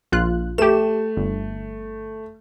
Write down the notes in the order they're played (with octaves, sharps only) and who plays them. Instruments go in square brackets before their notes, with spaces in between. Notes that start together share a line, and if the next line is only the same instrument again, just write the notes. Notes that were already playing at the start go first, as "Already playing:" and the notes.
[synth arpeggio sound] A#1 F4 F#6
[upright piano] A3 [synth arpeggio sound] G4 E7
[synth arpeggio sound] G1